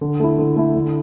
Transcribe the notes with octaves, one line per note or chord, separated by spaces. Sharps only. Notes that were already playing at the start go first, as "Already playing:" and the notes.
D3
A3 E4
D3
A3 E4
D3